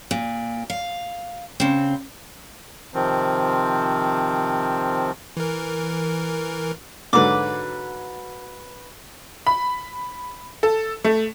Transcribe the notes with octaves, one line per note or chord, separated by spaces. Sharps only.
A#2
F5
C#3 C4
C3 D#3 F3 C4
E3 A#4
G#2 D3 F#3 B4 D6
B5
A4
A3